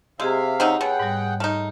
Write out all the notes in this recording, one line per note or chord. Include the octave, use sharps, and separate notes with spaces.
C3 G#3 G4 G#4 E5 F5 A#5
C4 C#4 D#4 F#5 E6
B2 G#4 C#5 F#5 G5
G#2 G3
A3 D#4 F6